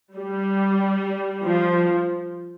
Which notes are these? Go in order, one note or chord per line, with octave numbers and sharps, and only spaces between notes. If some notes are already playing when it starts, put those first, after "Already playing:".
G3
F3